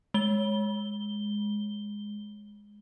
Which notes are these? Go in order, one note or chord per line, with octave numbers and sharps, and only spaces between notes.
G#3 G7